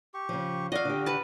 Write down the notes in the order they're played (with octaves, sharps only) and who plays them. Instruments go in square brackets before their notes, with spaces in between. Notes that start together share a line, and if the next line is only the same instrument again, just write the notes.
[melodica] G4 C#6
[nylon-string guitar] C#3 F3
[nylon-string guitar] F4 G#4 D5 [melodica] F#4 [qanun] D#5 F5
[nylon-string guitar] D3 G4
[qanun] B4 A5